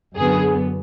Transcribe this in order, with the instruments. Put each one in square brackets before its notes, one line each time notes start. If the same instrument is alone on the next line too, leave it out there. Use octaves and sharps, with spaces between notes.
[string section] F#2 D3 F#3 B3 G#4